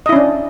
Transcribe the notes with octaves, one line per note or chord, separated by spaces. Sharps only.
C#4 D4 E4 D#5